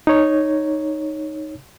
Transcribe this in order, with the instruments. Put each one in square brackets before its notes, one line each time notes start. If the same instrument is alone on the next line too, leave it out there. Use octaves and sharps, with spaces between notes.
[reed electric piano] D#4 C#5